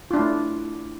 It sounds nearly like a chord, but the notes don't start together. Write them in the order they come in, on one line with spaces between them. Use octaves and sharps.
F4 D4 E4 A3